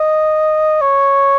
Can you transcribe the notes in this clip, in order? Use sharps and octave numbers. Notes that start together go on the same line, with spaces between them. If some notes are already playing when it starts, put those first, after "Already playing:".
Already playing: D#5
C#5